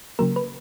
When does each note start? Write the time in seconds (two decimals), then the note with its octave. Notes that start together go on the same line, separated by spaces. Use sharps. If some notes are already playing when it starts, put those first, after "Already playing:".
0.19 C#3 F#3 A#3 A#4
0.36 B4